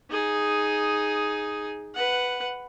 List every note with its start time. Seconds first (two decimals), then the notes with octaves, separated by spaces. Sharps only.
0.11 D#4 G#4
1.95 B4 F#5